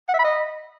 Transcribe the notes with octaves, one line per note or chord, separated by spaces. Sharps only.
F#5
E5
B5
D#5